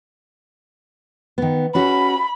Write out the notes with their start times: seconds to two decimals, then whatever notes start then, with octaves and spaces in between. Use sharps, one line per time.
1.38 D#3 B3
1.75 C#4 F#4 G#4 B5